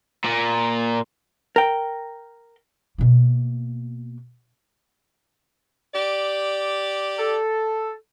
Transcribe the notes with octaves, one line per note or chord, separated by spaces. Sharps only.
A#2
A#4 G5
B2 A#3
G4 D5
A4